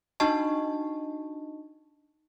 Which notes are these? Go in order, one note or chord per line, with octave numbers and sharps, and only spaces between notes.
D4 D#4 F#4 D#5 A5 C#6